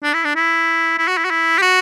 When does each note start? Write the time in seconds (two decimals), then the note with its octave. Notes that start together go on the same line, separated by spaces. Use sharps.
0.03 D4
0.14 E4
0.24 D4
0.35 E4
0.98 E4
1.08 F#4
1.17 E4
1.25 F#4
1.30 E4
1.58 G4
1.62 F#4